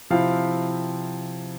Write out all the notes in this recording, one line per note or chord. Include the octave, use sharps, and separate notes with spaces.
C3 F3 C4 E4 F5